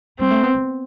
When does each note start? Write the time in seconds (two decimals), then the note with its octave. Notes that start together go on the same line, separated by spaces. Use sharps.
0.19 G3 C4
0.31 A3
0.43 B3
0.55 B3